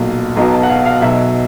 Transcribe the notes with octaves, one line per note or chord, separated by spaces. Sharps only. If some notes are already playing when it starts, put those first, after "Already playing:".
Already playing: B1 A#2 F#3
B1 B2 F#3 A#5
A5
F#5
F5
F5
B1 B2 F#3 E5